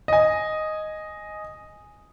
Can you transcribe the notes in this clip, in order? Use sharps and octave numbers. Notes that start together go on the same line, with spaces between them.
D#5 G#5